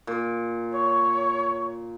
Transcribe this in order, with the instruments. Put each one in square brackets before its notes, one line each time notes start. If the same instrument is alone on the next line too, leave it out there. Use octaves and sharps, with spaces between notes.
[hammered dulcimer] A#2
[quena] C#5